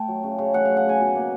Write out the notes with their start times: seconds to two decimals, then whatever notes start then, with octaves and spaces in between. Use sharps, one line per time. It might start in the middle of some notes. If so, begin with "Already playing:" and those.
Already playing: A3 G5 A5
0.08 F#3
0.23 C#3
0.38 C#3
0.53 A3 F#5
0.65 F#3 F5
0.77 F#5
0.85 C#3 G#5
1.01 B2
1.15 A#3